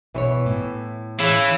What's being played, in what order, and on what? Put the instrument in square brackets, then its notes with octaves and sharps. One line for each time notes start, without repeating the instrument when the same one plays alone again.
[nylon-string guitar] B2 C5 C#5 [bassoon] E3
[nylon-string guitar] A2
[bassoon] C#3 [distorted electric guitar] E3 [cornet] E4